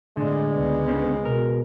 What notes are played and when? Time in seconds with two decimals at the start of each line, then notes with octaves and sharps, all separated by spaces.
0.17 A2 D3 G#3 C4 D5
0.51 C#2 B3
0.88 D3 C4 C#4
1.25 B2 A#4